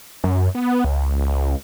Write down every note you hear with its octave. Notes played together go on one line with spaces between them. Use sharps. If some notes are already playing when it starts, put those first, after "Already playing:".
F#2
B3
C#2